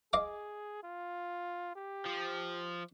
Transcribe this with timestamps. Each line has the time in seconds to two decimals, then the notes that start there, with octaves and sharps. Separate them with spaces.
0.13 G#4 D#5 F5 D6
0.83 F4
1.75 G4
2.06 F3